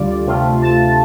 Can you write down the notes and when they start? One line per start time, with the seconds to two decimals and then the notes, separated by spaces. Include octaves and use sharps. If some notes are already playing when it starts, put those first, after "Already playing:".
Already playing: D2 D3 G3 F4 D5
0.26 D2 C3 A3 F4
0.62 A5